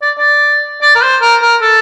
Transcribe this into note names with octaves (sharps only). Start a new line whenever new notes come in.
D5
D5
D5
A#4
C5
A#4
A#4
A4